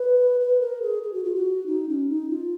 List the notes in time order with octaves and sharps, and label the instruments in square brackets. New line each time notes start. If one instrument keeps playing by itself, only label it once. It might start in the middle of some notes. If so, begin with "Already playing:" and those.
Already playing: [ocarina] B4
B4
A#4
G#4
G#4
F#4
F4
F#4
D#4
C#4
D#4
F4